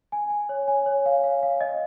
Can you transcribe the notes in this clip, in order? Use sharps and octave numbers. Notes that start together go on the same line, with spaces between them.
G#5
G#5
C#5
G#5
C#5
F5
F5
F5
D#5